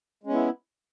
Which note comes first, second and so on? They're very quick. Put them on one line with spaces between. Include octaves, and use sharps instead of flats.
G#3 C#4 B3 E4